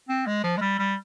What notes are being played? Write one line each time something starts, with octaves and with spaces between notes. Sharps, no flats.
C4
G#3
F3
G#3
G3
G3